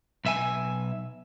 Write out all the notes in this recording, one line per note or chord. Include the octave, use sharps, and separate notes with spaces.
B1 E5 G#5